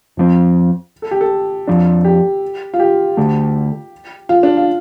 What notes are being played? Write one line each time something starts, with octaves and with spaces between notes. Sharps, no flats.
F2 F3 C4
A4
G4
A4
F2 F3 D4
G4
F4
G4
D2 D3 A3
F4
D4
F4